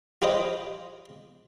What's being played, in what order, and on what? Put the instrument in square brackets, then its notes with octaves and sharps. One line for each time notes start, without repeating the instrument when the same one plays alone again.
[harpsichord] F4 G4 B4 C5 D#5